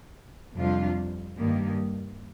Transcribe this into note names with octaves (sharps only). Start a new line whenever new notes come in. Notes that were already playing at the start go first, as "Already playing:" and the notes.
F2 C3 G3 D4 F4
G2 D#3 G3 A#3